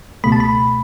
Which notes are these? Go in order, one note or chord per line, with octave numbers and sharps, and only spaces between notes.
C#2 B2 A3 B5
A5
B5